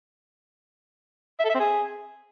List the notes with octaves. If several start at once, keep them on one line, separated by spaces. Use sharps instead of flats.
E5
A4
E5
C4
G#4